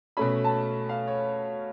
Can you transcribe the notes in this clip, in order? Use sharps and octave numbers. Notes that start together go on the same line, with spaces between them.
B2 A3 C#4 B5
A5
F5
C#5